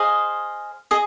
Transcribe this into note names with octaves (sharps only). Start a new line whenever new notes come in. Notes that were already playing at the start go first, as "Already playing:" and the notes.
Already playing: G#4 C5 D#5 F5
G#4 D#5